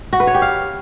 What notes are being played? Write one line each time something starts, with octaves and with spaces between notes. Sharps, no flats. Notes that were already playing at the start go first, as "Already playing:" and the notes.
F#4
B4
C#5
G4
F5